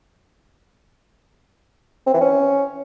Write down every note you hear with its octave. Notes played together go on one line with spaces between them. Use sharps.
C4
E3
C#4